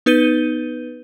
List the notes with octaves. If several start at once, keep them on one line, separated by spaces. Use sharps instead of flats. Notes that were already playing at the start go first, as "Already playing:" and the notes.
B3 D#4 B4 G6 D#7 G7